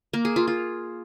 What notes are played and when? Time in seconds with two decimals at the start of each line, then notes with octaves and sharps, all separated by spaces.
0.13 A#3
0.25 G#4
0.36 F4
0.47 F4